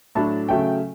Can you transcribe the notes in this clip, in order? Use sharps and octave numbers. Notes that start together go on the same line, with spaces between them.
A2 F#3 A3 D4 A5
C#3 F#3 A3 C#4 G5